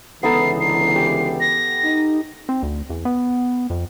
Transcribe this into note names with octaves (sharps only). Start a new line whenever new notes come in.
C#2 D3 E3 B3 D#4 A4 C7
C7
G4 D6
A#6
D#4
C4
D2
E2
B3
F2